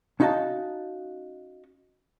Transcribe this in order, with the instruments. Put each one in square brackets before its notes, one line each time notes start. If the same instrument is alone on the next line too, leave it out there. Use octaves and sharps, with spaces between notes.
[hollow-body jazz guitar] C#4 D#4 F#4 D#5 F5 A5